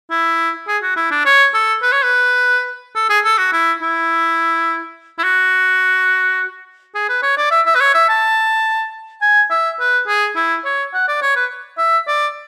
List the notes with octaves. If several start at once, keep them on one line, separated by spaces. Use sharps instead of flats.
E4
G#4
F#4
E4
D4
C#5
A4
B4
C#5
B4
A4
G#4
A4
F#4
E4
E4
E4
F#4
G#4
B4
C#5
D5
E5
E5
B4
C#5
E5
A5
G#5
E5
B4
G#4
E4
C#5
F#5
D5
C#5
B4
E5
D5